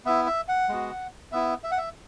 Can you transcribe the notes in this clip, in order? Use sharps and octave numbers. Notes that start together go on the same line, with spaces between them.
B3 E4 E5
E5
F#5
G#3 B3 F#4
B3 E4 E5
E5
F#5
E5